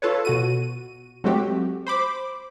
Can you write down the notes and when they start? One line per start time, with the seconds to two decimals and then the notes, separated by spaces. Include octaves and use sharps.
0.02 F4 A4 B4 C#5
0.25 B2 F#4 D#7
1.24 F#3 G#3 A3 C4 F#4 G4
1.86 C5 B5 D6